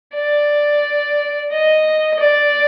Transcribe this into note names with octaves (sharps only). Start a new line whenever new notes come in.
D5
D#5
D5